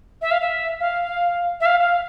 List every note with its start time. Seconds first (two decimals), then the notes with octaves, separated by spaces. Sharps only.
0.21 E5
0.31 F5
0.41 E5
0.80 F5
1.60 E5
1.66 F5
1.80 F5